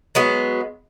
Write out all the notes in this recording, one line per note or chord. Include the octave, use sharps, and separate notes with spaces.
F#3 G#3 B3